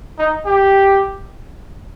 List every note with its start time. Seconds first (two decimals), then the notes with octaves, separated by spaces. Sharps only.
0.19 D#4
0.46 G4